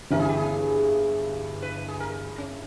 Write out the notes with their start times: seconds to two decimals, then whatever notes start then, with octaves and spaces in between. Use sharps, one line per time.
0.11 G1 G2 E3 A#4
0.20 G#4
0.29 G4
0.37 G#4
1.62 B4
1.88 G#4
2.00 A#4
2.38 C#4